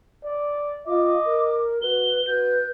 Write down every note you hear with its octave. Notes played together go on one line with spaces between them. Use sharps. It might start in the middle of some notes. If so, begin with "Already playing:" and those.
D5
F4 D#5 D6
A#4
F#4 B4 G7
F#4 B4 G6